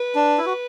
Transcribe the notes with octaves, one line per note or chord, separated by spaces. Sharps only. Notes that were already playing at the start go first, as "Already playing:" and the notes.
Already playing: B4
D4
E4
F#4